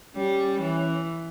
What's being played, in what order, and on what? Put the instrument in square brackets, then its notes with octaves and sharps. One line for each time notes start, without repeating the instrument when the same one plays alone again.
[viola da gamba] G3 [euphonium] C#4
[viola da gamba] E3